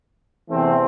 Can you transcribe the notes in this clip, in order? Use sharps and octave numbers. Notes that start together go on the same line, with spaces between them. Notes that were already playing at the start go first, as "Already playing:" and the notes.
E2 C3 E3 A3 C4